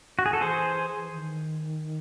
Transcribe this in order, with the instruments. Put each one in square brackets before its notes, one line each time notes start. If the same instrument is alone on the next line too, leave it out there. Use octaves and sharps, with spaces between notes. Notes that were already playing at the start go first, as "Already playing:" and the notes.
[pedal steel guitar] F#4
G#4
A4
[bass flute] E3 [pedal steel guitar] G#4 C5
[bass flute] D#3